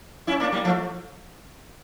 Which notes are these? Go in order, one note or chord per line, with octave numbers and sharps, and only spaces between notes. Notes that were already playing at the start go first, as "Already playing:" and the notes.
C#4 E4
A#3 D4
G3 A#3
F3 A3